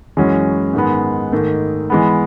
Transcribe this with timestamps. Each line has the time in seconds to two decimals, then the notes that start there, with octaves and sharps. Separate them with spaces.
0.17 F#2 E3 G#3 C#4 F#4
0.74 G#2 D#3 G#3 B3
1.32 G#2 D#3 A3
1.90 E3 G#3 B3